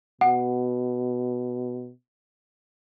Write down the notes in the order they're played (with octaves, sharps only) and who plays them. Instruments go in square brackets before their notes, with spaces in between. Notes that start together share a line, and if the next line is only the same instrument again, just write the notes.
[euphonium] B2 [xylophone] F#5